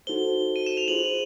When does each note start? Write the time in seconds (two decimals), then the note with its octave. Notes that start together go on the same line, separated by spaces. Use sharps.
0.07 D#4 F#4 A4 C5 G7
0.56 D#7
0.66 E7
0.77 F7
0.88 F4 G#4 C5 F#7